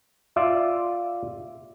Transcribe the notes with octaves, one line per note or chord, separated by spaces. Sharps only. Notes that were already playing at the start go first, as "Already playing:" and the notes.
F4 D5 E5